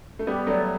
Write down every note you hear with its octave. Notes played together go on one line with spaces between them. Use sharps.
A3
G3 B3 G4
F#3 A3 B4 D5